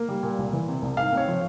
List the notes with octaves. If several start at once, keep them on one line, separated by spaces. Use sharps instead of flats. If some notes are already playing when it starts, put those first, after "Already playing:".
Already playing: A#3
G3
A#2
C2
E3
C3
C2
G#2 F5
C4 C#5
F3